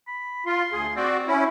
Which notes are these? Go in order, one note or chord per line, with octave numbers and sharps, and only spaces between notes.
B5
F4 C6
D2 G#4
C4 F#4 D5
C#4 E4